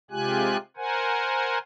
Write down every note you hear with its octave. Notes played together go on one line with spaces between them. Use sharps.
C3 G#3 F4 G4 G#5 F#6
A#4 C5 F#5 G#5